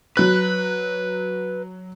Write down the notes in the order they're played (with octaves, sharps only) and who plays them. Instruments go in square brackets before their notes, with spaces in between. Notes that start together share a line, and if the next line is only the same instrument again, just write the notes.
[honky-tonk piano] F#3 F#6 [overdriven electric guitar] B4